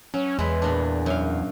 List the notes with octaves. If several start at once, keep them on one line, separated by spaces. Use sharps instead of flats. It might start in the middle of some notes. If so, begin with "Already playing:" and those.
F#3 C#4
E2 G#3 E4 B4
A#2 D4
F#2 F5